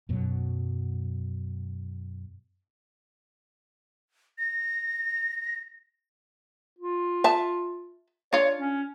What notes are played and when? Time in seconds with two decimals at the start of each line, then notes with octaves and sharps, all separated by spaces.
0.09 F#2 B2 F#3
4.38 A#6
6.79 F4
7.24 E5 A5
8.33 D4 F4 C#5
8.58 C#4